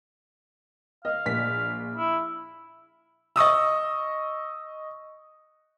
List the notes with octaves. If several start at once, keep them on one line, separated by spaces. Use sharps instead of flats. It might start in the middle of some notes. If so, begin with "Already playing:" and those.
D#5 F5
A#1 B6
E4
D#5 C#6 D#6 E6